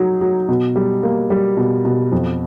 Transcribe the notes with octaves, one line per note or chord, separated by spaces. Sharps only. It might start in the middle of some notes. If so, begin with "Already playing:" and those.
Already playing: F#3 D#4
F#3
B2
G3
A#3
G3
B2
B2
F2